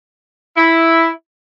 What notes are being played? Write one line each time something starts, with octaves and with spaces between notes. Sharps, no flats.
E4